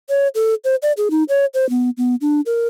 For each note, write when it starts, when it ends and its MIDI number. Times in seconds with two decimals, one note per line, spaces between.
0.09 0.28 73
0.35 0.54 69
0.64 0.75 72
0.83 0.92 74
0.97 1.09 68
1.11 1.23 63
1.29 1.45 73
1.54 1.69 72
1.70 1.90 59
1.98 2.15 59
2.21 2.41 62
2.46 2.68 70